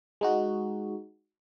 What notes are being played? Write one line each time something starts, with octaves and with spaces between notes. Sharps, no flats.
G#3 D#4 F#4